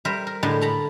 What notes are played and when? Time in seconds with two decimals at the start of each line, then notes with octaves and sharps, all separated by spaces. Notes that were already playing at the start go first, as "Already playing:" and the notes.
0.05 G3 A#4 C5 E5
0.27 A#4
0.43 A2 D3 G3 G#3 A5
0.61 A4 A#5 B5